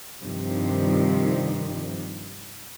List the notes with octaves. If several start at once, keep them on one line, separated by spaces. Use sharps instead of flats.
G2 C3 D#3 F3